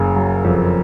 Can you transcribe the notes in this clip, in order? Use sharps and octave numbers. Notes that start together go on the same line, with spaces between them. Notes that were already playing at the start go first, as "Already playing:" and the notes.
Already playing: F#1 C#3
F#3
F2